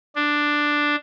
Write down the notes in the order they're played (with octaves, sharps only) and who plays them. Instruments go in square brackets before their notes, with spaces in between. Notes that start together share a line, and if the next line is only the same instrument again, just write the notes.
[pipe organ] D4